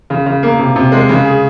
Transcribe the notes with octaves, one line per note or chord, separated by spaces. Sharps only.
C#3
C#3
A#3
C3
C3
G#3
C#3
G#4